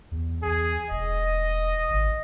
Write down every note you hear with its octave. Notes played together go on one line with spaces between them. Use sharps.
E2
E2 G#4
E1 D#5
G#1